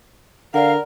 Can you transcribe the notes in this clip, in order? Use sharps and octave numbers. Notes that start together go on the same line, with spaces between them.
D3 A#4 D5 F5 F#5